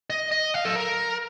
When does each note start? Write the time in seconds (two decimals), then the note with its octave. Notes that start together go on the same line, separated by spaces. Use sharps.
0.10 D#5
0.32 D#5
0.54 F5
0.65 A4
0.76 A#4